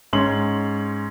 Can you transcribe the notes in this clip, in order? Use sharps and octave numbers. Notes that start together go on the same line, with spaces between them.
G#2 C#4 C6 F#7